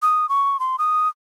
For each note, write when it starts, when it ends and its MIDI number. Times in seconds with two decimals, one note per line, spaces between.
0.02 0.29 87
0.29 0.60 85
0.60 0.76 84
0.79 1.08 87